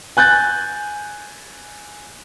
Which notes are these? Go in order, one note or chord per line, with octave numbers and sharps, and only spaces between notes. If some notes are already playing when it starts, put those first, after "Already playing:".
G#5 F#6 G6 A6